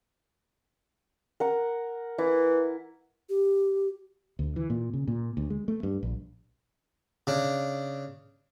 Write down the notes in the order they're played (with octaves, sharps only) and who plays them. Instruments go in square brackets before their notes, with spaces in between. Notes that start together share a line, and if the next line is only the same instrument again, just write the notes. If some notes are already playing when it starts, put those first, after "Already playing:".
[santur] A#4 F#5
[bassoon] E3 [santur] E4
[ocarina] G4
[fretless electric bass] D2
E3
A#2
C#3
A#2
D2
G#3
A3
G2
A#1
[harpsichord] C#3 D4